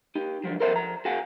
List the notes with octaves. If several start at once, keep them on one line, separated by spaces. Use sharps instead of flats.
D#4 G4
D3 F3 F#3
A4 A#4 C5 E5
F3 A#5
F#4 G#4 F5 F#5 G#5